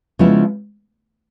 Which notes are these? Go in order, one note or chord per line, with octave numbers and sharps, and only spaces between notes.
C#3 F3 G#3 B3 E4